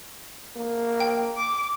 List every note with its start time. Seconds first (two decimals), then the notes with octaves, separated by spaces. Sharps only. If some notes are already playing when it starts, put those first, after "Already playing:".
0.56 A#3
1.00 G5
1.37 D6